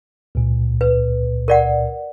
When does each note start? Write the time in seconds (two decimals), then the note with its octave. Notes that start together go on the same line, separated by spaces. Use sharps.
0.35 C#2 A#2
0.81 B4
1.48 A#4 D5 F#5